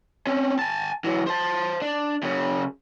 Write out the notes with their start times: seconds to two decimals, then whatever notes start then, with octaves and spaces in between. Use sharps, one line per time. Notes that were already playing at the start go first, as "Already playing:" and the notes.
0.27 C4 C#4
0.59 G#5 A5
1.04 E3 F#3
1.27 C5 A5
1.82 D4
2.23 F#2 C#3